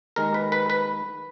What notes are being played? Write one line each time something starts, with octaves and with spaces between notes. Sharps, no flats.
D#2 D#3 G#3 A#4
B4
B4
B4